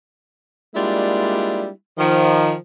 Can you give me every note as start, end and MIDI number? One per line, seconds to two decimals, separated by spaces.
0.75 1.68 55
0.75 1.68 56
0.75 1.68 58
0.75 1.68 62
0.75 1.68 64
0.75 1.68 65
1.98 2.54 51
1.98 2.54 53